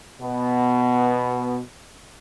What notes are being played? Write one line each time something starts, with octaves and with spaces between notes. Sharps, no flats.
B2 B3